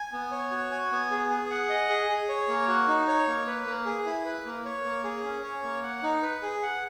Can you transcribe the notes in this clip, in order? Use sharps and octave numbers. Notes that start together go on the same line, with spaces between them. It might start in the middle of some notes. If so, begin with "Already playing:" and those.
Already playing: G#5
B3
C#5
F#4
G#5
B3
G#4
G#4
F#5
D#5
G#4
G#4
C#5
A#3
F#4
D#4
C#5
A#3
B4
A#3
G#4
E4
B4
A#3
C#5
A#3
G#4
C#4
C#5
A#3
F#5
D#4
B4
G#4
F#5